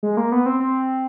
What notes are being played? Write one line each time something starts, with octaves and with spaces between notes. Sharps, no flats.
G#3
A#3
B3
C4
C4